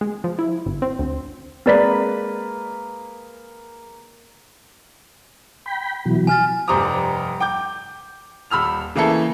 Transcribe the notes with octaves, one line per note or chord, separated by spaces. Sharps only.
G#3
F3
E4
G1
C4
D2
G#3 A#3 C4 B4 D5 B6
G5 B5
B2 E3 F#3
G#5 F6 A6
F1 G2 C5 A#5 D6 D#6
G5 D6 G6
D#1 B5 E6 F6 F7
C#3 E3 A#3 E4 A4